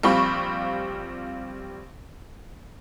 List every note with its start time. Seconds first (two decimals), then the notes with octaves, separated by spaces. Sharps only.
0.03 A#1 G3 C4 F4 B5 C#6